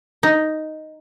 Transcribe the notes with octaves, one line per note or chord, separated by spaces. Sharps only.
D#4